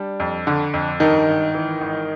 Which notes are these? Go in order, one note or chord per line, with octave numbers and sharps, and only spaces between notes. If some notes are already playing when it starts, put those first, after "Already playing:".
Already playing: G3 D4
F2
D3
F2
G2 D#3 D#4
G#1
E3
G#1